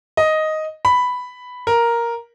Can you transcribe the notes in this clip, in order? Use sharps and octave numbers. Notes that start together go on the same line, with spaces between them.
D#5
B5
A#4